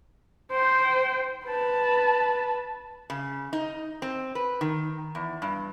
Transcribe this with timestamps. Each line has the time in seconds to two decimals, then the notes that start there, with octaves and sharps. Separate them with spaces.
0.51 C5 G5
1.46 B4 A5
3.10 C#3
3.53 D#4
4.02 C4
4.35 B4
4.61 D#3
5.15 E2
5.42 G2